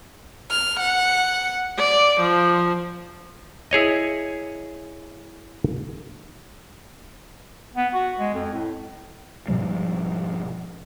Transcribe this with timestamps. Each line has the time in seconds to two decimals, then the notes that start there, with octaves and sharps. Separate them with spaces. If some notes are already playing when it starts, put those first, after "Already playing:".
0.50 F6
0.79 F#5
1.78 D5
2.20 F3
3.71 E4 G#4 C#5 D#5
7.77 B3
7.94 F#4
8.20 G#3
8.34 F2
8.53 A2
9.48 G#2 B2 F3 G3